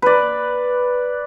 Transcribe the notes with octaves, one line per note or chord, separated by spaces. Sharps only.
B4 D5